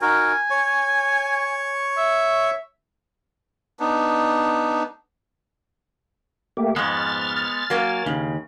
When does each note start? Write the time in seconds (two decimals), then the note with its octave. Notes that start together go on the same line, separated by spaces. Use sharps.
0.02 D#4 F#4 A#4 G#5
0.50 C#5 C#6
1.98 E5
3.80 B3 D4 D#4
6.57 A3 A#3 G4
6.76 F2 G#2 G#3 B3 F6 A6
7.70 F#3 A#3 C#4
8.06 D#2 C#3